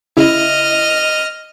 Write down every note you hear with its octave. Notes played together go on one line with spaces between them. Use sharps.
C#3 E4 D#5 F6